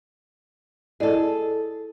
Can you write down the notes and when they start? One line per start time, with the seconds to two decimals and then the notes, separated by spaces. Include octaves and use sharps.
1.00 E4 G#4 A4 D5 D#5